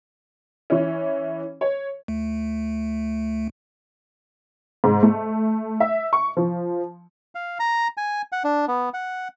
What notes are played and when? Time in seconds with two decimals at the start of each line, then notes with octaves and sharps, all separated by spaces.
0.70 E3 C#4
1.61 C#5
2.08 D2 A3
4.84 G#2
5.03 A3
5.80 E5
6.13 C#6
6.37 F3
7.35 F5
7.59 A#5
7.97 G#5
8.32 F#5
8.44 D4
8.68 B3
8.94 F#5